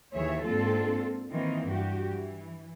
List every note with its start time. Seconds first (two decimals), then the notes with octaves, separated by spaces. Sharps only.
0.13 D#2 E3 G#4 C#5 E5
0.45 G#2 A#3 C4 D4 F4 A4
1.31 D#3 E3 A#3 C4 D#4
1.68 G2 F#4 G4
2.09 E3